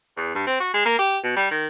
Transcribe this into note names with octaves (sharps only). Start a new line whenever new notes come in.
E2
G2
C4
F#4
G#3
A#3
G4
B2
G3
D#3